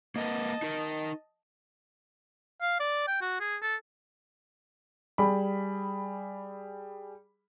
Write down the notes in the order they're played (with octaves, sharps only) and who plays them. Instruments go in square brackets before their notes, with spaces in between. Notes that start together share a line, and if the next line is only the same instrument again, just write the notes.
[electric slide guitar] A#3 A#4 B4 [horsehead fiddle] D#5 A5
[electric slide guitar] D#4 A#4
[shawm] F5
D5
G5
F#4
G#4
A4
[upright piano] G3 G#4 B5